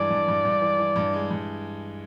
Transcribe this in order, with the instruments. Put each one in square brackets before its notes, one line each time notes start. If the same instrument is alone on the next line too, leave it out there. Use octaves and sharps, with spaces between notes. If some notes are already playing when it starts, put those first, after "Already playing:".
Already playing: [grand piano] G2 E3 G#3 [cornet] D5
[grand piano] G2
G2
G2
E3
E3
G2
G#3
G2